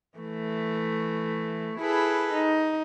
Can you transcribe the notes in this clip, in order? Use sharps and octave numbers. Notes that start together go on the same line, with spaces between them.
E3 A3
E4 G#4 A4 B4
D#4